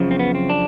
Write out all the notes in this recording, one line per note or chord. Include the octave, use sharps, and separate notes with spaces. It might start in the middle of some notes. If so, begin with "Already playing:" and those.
Already playing: F#2 C#3 F3
C4
B3
C4
D4